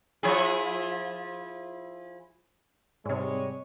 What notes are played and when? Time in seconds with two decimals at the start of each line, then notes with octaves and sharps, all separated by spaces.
0.23 F3 E4 G#4
3.05 G#2 C3 G3 G#3 C#5